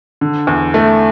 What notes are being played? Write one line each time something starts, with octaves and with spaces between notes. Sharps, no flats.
D3
E2
A3